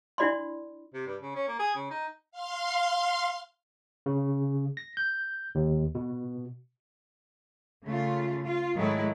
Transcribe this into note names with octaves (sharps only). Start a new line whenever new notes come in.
D4 E4 F#4 D5 B5 C6
C3
G2
C#3
C#4
A#3
G#4
C#3
D#4
F5 C6
C#3
A#6
G6
D#2
B2
C#3 A3 F4
F4
G#2 D#3 F#3 G#3 A3 E4